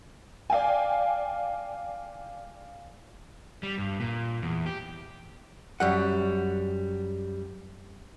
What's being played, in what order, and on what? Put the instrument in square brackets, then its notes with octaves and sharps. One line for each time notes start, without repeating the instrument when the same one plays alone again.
[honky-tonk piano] D5 F5 G5 G#5
[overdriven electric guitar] G3
G2
A#2
E2
G4
[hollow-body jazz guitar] F#2 G3 F#5